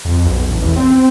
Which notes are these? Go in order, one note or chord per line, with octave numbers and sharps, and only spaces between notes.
F2
B1
A1
E2
C4
C4